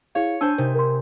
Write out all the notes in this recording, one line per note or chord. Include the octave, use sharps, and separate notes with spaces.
E4 G#4 C#5 F5 C#7
D4 C5 G#5 A5 E6
C3 D#4 A#4 C5
A#4 C6